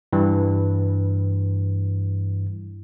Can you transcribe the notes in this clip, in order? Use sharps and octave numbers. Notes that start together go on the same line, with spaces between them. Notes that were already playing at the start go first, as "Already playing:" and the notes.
G2 E3